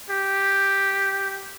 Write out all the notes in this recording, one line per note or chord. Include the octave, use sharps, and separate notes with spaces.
G4